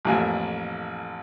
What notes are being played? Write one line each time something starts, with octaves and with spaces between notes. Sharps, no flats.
A1 F2 E3 A#3 E5 G#5